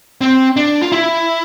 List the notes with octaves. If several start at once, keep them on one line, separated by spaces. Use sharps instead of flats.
C4
D4
F4
E4